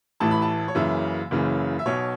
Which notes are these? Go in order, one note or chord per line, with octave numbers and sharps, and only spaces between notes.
A1 A2 E3 A5
B5
A5
C#5
F#1 F#2 C#3 E3 E5
F#1 F#2 C#3 E3
E5
B1 B2 C#5